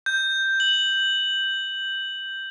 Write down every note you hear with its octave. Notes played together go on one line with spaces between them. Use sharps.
G6
F#7